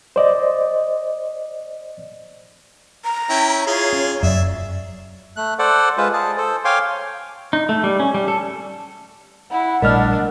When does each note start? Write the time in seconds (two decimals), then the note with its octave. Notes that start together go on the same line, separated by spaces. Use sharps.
0.16 C5 D5 D#5
3.05 A#5
3.30 C#4 E4 G5
3.67 F4 G#4 C#5
3.93 C#4
4.23 F1 F#2 D5 E5
5.36 A3 F#6
5.59 A4 C5 D5 F#5
5.97 G#3 F4 B4 C5
6.13 G#4 A5
6.38 A4 C5
6.65 C#5 F5 G5 G#5 C6 D6
7.53 D#4
7.69 A3
7.84 G3
7.99 C#4
8.14 G3
8.28 A4
9.51 E4 F#5
9.82 A#1 G3 A3 D4 A#4 D#5 F6